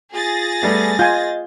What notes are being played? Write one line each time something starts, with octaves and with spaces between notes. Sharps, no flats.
F4 G#4 A6 A#6
G3 A3 B3
F4 D#5 G#5 G6